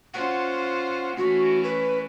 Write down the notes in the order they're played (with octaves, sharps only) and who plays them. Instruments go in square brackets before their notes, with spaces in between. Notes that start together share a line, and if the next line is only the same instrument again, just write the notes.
[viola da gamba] C#4 F4 C5 [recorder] F#5
[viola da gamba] E3 A3 C#4 [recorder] F#4
[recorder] B4